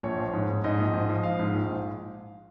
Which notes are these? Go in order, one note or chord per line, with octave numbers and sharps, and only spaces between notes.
A#1 C#5
F3
G#2
G#2
G#2 D#5
A#1
G#2
F3
F3 F5
G#2
A#1
G#2